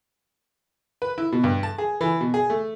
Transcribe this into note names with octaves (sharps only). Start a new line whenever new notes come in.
B4
E4
B2
G2
A5
G#4
E3
B2
G#4
A3